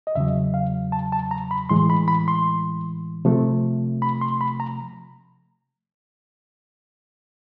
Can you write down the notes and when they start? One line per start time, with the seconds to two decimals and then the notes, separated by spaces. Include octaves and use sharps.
0.07 D#5
0.15 E2 C#3 F#3 E5
0.54 F5
0.92 A5
1.12 A5
1.31 A#5
1.51 B5
1.69 A2 E3 G#3 C6
1.90 B5
2.08 B5
2.28 C6
3.25 C3 F3 A3
4.02 B5
4.21 C6
4.41 B5
4.60 A#5